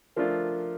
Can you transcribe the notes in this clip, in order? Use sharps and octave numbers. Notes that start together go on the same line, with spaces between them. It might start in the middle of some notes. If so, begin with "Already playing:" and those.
F3 A3 D4 F4 A#4
A#4